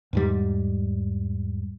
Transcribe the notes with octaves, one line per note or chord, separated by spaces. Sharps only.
E2 G#2 G3